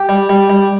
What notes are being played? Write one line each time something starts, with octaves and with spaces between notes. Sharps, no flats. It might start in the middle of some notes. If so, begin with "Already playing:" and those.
Already playing: G4
G3
G3
G3